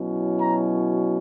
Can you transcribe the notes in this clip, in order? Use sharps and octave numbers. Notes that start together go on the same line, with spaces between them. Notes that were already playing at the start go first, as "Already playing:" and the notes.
Already playing: B2 F#3 C#4 E4
A#5